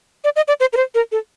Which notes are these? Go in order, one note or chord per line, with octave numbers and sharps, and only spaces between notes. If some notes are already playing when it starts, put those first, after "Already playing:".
D5
D#5
D5
C5
A#4
C5
A#4
A4